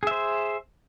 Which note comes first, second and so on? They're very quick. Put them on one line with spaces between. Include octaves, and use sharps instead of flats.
G#4 E5 C5